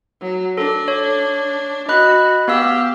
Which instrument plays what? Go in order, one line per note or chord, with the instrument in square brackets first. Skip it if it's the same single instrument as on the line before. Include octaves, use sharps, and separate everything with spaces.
[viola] F#3
[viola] D4 [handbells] A4
[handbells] C#5
[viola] F#4 [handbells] D#5 B5 F#6
[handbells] B3 F5 E6 [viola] G4